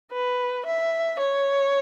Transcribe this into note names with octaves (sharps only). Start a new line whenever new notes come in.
B4
E5
C#5